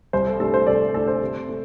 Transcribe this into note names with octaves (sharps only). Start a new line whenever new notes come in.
C2 C5
A4
C3 A3 D4 A4
C5
C2 A4 D5
C3 A3 D4 A4
C5
C3
A3